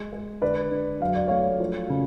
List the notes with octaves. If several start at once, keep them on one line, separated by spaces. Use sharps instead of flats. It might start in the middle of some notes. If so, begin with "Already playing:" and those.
Already playing: G#3
G#3
D3 B4 D5
D3
F#3 F5
D5
A3 C#5 F5
F3
C#3